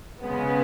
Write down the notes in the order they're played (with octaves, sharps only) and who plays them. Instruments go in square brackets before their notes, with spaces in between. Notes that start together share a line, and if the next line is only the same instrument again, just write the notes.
[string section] C#3 G#3 B3